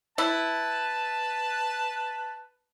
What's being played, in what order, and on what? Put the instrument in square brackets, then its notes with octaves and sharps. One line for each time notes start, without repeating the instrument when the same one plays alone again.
[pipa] E4 [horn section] B4 A5